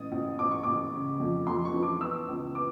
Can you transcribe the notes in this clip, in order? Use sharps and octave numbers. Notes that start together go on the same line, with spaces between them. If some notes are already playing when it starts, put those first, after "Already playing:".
Already playing: A1 D#6
A1
A1 D6
C#6
A1 D6
C#3
F2
F2 C6
C#6
E3
D6
B3 E6
C#2
B3 D6